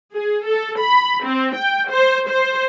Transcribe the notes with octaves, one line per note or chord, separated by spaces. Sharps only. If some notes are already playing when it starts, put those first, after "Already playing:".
G#4
A4
B5
C4
G5
C5
C5